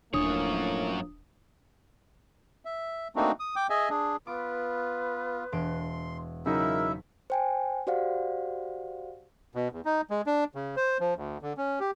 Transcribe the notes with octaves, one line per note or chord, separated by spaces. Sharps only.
D#1 F#2 A2 F3 A#3 D4 C#5 D#6
E5
A3 A#3 C4 D4 D#4 F#4
D#6
G5 D6
G#4 D#5 E5 G#5
D4 G#4
B3 F4 B4 D6
E1 C6 D7
C#3 F#3 D#4 E4 A#4 E5
C5 G5 G#5
F#4 G4 C5 D5 F5 F#5
B2
E2
D#4
G#3
D4
C#3
C5
F3
D2
D3
C#4
G4